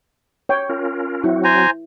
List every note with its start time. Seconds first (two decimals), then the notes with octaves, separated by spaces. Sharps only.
0.49 C#5 G5
0.69 C#4 F4 A#4
1.24 F#3 C4 E4 F#4
1.44 C5 G#5 A#5